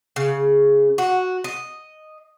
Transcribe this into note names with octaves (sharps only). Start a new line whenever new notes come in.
C#3
F#4
D#5